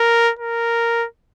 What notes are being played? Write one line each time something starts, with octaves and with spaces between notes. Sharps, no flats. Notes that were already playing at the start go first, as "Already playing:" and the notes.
Already playing: A#4
A#4